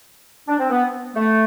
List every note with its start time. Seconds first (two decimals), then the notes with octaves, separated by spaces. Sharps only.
0.48 D4
0.59 C4
0.70 B3
1.16 A3